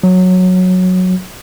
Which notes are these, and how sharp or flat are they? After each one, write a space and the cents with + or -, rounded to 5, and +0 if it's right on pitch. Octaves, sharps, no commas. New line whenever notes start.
F#3 -10